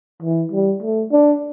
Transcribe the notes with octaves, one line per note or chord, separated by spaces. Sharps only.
E3
G3
A3
D4